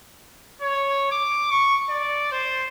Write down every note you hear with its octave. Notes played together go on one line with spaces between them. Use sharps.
C#5
D6
C#6
D5
C5